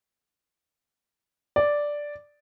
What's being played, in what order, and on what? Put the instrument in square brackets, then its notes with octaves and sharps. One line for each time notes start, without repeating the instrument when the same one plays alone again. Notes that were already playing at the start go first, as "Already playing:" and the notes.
[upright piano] D5